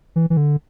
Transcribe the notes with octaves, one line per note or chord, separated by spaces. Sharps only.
E3
E3
D3